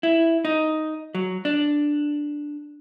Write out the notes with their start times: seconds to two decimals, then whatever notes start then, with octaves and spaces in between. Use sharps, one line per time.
0.03 E4
0.45 D#4
1.15 F#3
1.45 D4